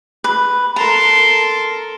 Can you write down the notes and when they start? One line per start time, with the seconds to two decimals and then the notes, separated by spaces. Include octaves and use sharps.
0.24 B4
0.76 A4 A#4 A5 A#5 C6